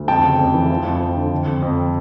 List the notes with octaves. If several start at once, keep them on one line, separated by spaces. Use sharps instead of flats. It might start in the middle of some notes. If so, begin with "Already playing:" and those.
Already playing: D2
F2 G5 A5
C#3
F2
E3
F3
F2
F3
D3
F2
F2
F2